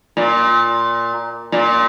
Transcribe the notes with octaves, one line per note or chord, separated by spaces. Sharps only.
A#2
A#2